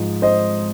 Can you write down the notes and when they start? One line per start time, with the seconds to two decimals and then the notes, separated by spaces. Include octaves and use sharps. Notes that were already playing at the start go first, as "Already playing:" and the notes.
Already playing: G#2 F3
0.22 C5 D#5